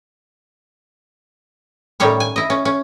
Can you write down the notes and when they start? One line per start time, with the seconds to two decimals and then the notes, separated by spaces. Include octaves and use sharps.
2.00 A2 D#3 G3 C#4 C#5
2.20 G#5
2.36 E4 D#5
2.50 C#4
2.65 C#4